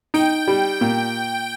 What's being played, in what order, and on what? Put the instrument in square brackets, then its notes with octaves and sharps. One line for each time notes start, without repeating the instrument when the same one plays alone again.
[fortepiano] D#4 [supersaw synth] G5
[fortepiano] G3
A#2